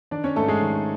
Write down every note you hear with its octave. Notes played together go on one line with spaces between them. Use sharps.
D#3 D4 D5
C#4 C#5
G#2 A3 A4
G#3 G#4
D#3